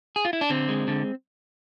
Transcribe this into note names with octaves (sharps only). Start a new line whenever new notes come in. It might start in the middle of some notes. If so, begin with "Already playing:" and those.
G#4
F4
E4
D4
D3 C4
G#3
D3